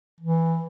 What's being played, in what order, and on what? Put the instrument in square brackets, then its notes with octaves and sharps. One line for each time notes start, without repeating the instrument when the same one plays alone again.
[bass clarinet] E3